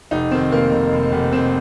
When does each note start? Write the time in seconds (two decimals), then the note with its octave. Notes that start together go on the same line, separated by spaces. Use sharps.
0.11 F1 D#4
0.31 D#3 C4
0.52 F1 A#3
0.71 F1
0.92 F1
1.12 F1
1.32 F1 C4